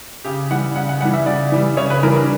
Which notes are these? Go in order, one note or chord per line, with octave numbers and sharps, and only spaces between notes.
C#3 G4
E3 G3 F#5
C#3 F#5
F#5
E3 G3 F#5
E5
C#3 D5
E3 G3
C#3 C#5
B4
E3 G3 A#4
D4